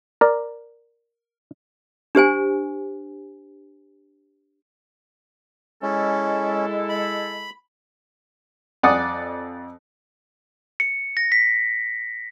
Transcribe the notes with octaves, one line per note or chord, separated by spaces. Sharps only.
A#4 D5
D4 G4 C5 G#5
G#3 C#4 E4 A4
B5
F2 D5 F#5 G#5 D#6
C#7
A#6
B6